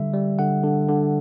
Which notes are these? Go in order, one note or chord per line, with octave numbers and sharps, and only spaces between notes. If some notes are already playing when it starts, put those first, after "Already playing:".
Already playing: D3 G3 E5
G3
D3 F#5
D3
D3